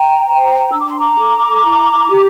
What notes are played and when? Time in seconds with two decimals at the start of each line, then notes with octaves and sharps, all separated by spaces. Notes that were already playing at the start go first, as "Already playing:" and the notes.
Already playing: G5 A#5
0.27 C5
0.72 D4 E6
0.81 D6
0.90 C6
0.98 A#5 D6
1.19 A4
1.64 E4
2.09 G4